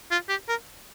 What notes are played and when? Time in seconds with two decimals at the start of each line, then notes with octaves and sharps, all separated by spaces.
0.11 F4
0.29 G4
0.49 A#4